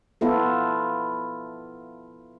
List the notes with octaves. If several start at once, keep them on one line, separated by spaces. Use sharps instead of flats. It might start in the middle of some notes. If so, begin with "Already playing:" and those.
B3 E4 F4 A4